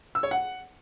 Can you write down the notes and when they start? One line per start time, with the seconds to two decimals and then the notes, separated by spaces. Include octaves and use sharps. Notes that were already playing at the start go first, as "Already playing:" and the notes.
0.15 E6
0.23 C#5
0.31 F#5